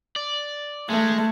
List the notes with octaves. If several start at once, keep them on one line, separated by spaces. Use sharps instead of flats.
D5
G#3 A3